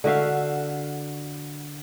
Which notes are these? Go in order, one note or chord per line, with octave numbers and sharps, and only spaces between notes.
D3 F#4 E5 F5